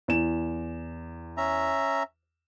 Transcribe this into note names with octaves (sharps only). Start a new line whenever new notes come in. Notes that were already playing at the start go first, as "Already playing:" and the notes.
E2 E7
C#4 E5 A#5